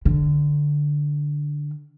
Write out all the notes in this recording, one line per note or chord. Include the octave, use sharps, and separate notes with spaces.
D3